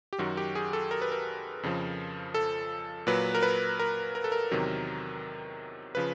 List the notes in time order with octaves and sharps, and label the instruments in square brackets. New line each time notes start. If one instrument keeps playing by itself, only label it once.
[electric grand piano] G4
F#2 D#3 F#3 F#4
G4
G#4
A4
A#4
B4
A#4
F2 C#3 F3
A4
A#2 F#3 B4
A#4
B4
A#4
A#4
A4
A#4
E2 C3 D#3 F#3
C#3 F3 B4